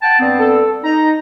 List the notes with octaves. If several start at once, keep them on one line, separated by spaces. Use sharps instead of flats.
F#5 G5 A5
G2 B3 C4
A4
D#4 A#5